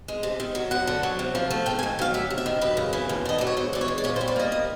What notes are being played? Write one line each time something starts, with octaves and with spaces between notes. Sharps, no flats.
G#3
C3
D#3
F#3
F#2 F#5
D3
F#3
C3
F3
A3
G#2 G5
G#5
D#3
F#3 F5
D2 E5
C3
E5
D#3
F#2 B4
C#3
E3
D#2
D3 D#5
F#3 D5
C#5
G#2 C5
E3 D5
C#5
G#3
D5
A#2 C#5
C5
G3
D5
A#3 D#5
D#5